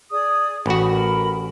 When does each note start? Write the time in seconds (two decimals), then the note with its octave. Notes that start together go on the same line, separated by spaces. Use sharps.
0.11 G#4 D5 D#6
0.66 A1 F#4 B5
0.91 A#4 B5